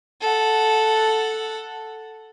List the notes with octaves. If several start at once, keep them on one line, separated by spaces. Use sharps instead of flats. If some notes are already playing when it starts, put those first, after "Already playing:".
A4 F#5